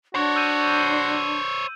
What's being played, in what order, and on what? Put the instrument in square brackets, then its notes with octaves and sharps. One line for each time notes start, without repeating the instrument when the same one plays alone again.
[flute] D4 [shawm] F#4 [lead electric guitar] C5 C#5
[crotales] E6 G6 D#7